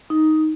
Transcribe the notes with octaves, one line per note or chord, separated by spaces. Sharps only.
D#4